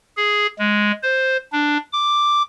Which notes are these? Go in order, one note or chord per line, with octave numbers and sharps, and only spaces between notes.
G#4
G#3
C5
D4
D6